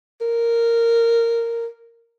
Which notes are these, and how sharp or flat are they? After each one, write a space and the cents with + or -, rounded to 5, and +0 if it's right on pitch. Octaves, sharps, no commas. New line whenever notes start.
A#4 -10